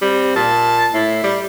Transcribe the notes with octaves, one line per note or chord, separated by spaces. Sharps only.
G3 C4
A#2 A5
A2 E4
G3